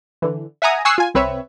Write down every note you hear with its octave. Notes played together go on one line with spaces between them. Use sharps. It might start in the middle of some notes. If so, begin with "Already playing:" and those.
D3 E3
E5 F#5 G#5 A#5 D#6
G#5 C#6 D#6 E6 F#6 C7
F4 G#5
C2 C4 B4 C#5 E5